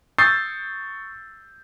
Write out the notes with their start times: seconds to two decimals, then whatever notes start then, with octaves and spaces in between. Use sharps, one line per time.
0.18 C#6 D#6 E6 G6 A6 C7